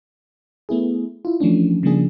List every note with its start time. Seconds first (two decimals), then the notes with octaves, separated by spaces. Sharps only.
0.69 A3 B3 E4 G#4
1.25 E4 F4
1.40 E3 F3 A3 C#4 D4
1.83 C#3 F3 G3 A#3 D4 G#4